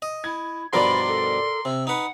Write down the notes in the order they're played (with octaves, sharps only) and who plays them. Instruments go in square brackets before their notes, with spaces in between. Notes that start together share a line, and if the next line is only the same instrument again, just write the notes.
[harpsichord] D#5
[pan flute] E4 [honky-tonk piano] G#6
[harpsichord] G2 B2 F3 [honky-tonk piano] A#4 D5 [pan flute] B5 [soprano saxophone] C6
[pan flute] A4
[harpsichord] C3 [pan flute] E6
[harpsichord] D#4 B4 [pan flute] F#5